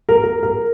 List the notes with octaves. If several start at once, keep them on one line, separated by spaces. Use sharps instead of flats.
A#4
A#4
A#4